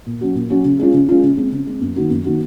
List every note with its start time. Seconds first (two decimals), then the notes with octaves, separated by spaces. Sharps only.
0.06 A#2
0.21 F#3 C#4 F#4
0.35 A#2
0.50 F#3 C#4 F#4
0.65 C#3
0.79 G#3 C#4 F4
0.94 C#3
1.09 G#3 C#4 F4
1.23 C#3
1.37 G#3 C4
1.52 C#3
1.67 G#3 C4
1.81 F#2
1.96 D#3 A#3 D#4 F#4
2.10 F#2
2.25 D#3 A#3 D#4 F#4